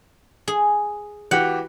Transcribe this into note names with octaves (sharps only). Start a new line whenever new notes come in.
G#4
E3 F#4 G4 F#5